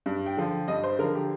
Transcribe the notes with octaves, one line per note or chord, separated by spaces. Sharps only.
G2
G5
D3 F3
G2 D#5
C5
D3 F3 A#4
G4